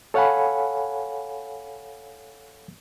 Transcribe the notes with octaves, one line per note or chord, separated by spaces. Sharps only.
A4 C#5 F5 F#5 G#5 B5